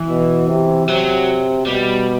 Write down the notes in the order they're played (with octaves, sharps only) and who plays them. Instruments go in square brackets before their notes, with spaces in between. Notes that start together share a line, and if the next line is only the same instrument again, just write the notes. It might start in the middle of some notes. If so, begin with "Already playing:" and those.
Already playing: [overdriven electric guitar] E3
[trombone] B2
C3
[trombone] C3 [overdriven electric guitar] F#3
[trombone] B2 [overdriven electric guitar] G3